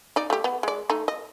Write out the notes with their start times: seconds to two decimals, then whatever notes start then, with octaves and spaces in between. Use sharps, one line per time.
0.16 D#4 D5
0.30 A3 G4
0.44 B3
0.63 G#3 D5
0.90 A3 D#4
1.08 D#5